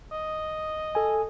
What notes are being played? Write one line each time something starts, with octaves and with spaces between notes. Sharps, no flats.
D#5
A4 G#5